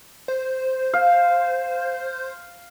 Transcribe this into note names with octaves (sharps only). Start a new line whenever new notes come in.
C5
F5